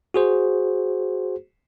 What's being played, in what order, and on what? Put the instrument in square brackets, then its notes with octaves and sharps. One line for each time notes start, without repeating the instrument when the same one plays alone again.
[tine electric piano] F#4 G#4 C5